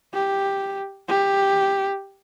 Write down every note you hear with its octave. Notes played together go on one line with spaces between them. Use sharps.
G4
G4